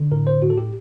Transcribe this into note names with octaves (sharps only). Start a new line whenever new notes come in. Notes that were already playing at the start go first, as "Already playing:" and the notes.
Already playing: D3
A2 A#4
C5
A2 F#4
A4
G4